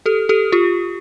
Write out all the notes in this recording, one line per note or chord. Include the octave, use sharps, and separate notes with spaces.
G4 A4
G4 A4
F4 G4